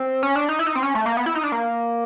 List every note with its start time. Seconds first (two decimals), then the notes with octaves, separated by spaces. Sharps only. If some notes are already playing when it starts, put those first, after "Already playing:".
Already playing: C4
0.23 C#4
0.36 D4
0.49 D#4
0.59 E4
0.66 D#4
0.75 C4
0.83 C#4
0.95 A3
1.06 A#3
1.17 B3
1.26 E4
1.35 D#4
1.43 D4
1.52 A#3